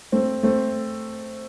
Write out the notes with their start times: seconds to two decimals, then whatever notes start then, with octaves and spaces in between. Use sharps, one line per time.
0.12 A3 C4
0.43 A3 C4